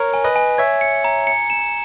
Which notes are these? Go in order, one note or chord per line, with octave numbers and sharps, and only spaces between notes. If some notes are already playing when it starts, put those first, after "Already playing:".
Already playing: A#4 C#5
G#5
B4 D#5
G#5
C#5 E5 G#6
C#7
A#5
C#7
E7